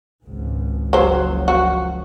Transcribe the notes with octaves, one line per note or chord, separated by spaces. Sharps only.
G#1 C#2 G#2
F#1 C#2 F3 F#3 C5
F#4